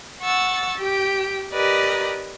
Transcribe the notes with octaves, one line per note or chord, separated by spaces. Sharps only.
F#5 C#6 E6 A6
G4 G5
G4 A#4 B4 D5 D#5